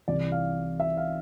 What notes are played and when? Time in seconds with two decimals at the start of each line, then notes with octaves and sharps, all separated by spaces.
0.08 C2 C3 E3 D5
0.32 F5
0.80 E5
0.97 F5